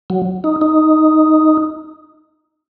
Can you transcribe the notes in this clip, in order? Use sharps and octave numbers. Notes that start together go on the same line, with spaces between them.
F#3
D#4
D#4